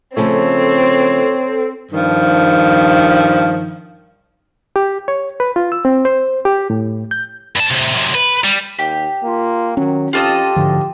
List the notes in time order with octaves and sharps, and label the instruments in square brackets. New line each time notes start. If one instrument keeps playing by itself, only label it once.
[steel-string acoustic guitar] C#3 F3 A3 [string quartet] C4 [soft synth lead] A4 [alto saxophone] C#5
[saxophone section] G2 D#3 F3
[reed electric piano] G4
C#5
B4
F4
E6
C4
C5
G4
A2
G6
[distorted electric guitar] G2 A5
A2 C3
F#2 C3
B4
G3
[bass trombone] D#2 [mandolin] G4
[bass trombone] A#3 [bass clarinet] F4
[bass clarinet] D#3 [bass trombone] F#3 [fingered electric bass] C#4
[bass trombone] F2 [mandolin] F4 A4 D#5 [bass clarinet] G4
[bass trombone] D2 [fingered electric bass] G#2 D3 F3